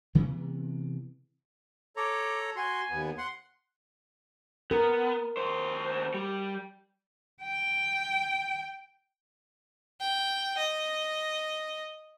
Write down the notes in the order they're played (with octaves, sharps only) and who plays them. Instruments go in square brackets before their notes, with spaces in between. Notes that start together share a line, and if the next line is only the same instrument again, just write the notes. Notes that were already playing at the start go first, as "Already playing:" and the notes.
[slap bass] C3 E3 G#3 B3
[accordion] A4 C#5 A#5 [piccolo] D6
[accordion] F#4 C6 [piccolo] G#5
[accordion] D#2 B3
F#5 C6
[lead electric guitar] B3 [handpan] A#4
[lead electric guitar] D#2 C5
G3
[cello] G5
[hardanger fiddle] G5
D#5